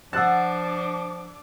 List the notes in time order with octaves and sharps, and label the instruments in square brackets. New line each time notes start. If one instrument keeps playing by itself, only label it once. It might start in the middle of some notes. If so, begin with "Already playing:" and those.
[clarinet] F3 [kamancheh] D4 D6 [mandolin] F#5 A5 [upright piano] E6 F#6 A6